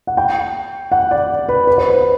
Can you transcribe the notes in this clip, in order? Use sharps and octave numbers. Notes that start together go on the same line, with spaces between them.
F#5
G5
F#5
D5
B4
B4
C5
B4